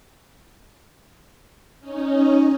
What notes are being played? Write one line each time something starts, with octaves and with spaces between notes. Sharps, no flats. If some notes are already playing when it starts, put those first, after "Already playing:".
C#4 D#4